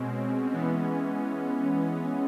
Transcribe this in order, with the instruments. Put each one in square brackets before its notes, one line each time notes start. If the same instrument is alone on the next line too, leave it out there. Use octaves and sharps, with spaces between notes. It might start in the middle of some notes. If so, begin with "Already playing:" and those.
Already playing: [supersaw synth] B2 G#3 C#4 [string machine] C4
[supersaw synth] E3 G#3 B3 [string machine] C#4